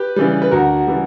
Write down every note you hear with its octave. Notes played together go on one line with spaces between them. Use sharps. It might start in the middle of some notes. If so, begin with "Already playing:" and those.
Already playing: G4 B4
C#3 E3 G3
B4
D2 F#4 A#4
C#3 E3 G3